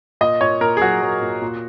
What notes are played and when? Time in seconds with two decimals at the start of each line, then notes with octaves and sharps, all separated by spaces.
0.21 A#2 D#5
0.41 A#2 C#5
0.61 A#2 A#4
0.77 G#4
0.82 F#3 F#4
1.02 F#3
1.22 A#2
1.42 A#2